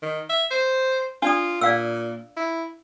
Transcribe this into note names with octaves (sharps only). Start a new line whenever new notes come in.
D#3
E5
C5
D4 F4 D5 D#6
A#2 D5 F5 E6
E4